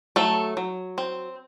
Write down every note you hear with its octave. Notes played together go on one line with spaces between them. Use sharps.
F#3 A3 A4
F#3
C4